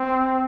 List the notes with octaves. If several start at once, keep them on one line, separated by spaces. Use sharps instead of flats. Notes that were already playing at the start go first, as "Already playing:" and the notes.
Already playing: C4